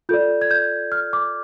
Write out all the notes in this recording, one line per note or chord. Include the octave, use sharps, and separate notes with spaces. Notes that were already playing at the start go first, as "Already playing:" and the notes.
F4 A4 D5 G6
G#6
G6
F6
D6